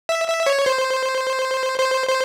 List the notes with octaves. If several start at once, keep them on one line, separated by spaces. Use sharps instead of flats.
E5
E5
C#5
C5
C5
C5